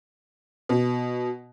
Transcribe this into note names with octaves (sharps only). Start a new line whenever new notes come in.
B2